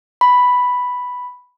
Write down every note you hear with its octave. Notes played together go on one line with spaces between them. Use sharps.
B5